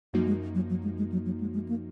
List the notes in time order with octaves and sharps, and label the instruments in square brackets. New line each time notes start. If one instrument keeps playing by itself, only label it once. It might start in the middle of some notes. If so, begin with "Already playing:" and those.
[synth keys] F#2 F3 A#3 D#4 F#4 [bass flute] F#3
[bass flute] G#3
F#3
F#3
G#3
G#3
F#3
F#3
G#3
G#3
A#3